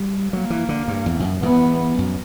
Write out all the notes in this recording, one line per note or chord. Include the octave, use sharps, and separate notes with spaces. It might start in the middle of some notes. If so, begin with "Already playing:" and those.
Already playing: G3
F#3 A#3
E3
D3
G2
E2
E2
F#2
E2 B3
F#2